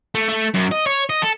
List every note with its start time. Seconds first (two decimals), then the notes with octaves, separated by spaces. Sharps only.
0.15 A3
0.29 A3
0.54 F#2
0.71 D#5
0.86 C#5
1.09 D#5
1.22 A4